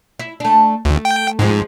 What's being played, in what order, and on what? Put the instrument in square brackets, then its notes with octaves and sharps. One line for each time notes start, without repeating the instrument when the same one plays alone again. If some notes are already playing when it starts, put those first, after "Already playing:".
[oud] E4
A3 D4
[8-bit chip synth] D2 [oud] A3
[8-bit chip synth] G5
[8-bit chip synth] G#2 [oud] F3 G#3 C4